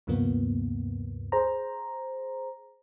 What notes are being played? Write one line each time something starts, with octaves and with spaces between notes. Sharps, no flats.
D2 G2 C3 F3 A#3 B3
G#4 C5 A#5